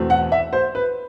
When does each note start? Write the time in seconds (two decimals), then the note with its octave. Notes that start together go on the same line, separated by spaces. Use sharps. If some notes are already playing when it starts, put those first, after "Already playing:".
Already playing: E2 B2 A3 C4
0.10 F#5
0.32 E5
0.53 C5
0.75 B4